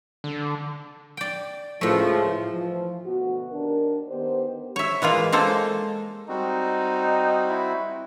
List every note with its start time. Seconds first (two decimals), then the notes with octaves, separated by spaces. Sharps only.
0.24 D3
1.17 D5 G5
1.81 C#2 A2 F3 A3
2.51 E3 F3
3.05 D2 B2 F#4
3.51 D#2 D4 A#4
4.08 D#3 B3 G4 C5
4.76 C#5 E5
5.02 E3 G#3 A#3 F4
5.32 G#3 A#3 A4 C5
6.29 G3 C4 D#4 F#4
7.49 E4